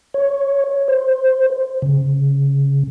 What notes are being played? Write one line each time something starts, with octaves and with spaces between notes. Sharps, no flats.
C#5
C5
C#3